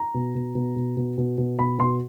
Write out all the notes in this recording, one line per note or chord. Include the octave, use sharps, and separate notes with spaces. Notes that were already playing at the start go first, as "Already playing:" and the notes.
Already playing: A#5
B2
B2
B2
B2
B2
B2
B2
B2 B5
B2 C6